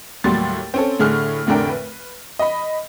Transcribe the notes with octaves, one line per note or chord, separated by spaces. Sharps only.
D#2 A2 F#3 G3 C6 A6
C4 C#4 A4
A2 D3 G#4 F6
F1 A2 D3 D4 A#4 G5
B4
D#5 B5